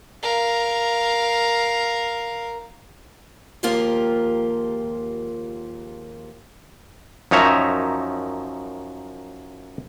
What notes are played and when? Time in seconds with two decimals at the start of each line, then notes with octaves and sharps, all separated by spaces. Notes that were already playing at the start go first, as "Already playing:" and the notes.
0.22 A#4 F5
3.63 D#2 G#2 F3 A#3 F4 G4
7.31 F#2 F3 D#4 C#5 E5 A#5